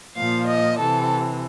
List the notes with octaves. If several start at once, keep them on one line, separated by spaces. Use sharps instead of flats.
A#2 F3 F5
D#5
C3 E3 A4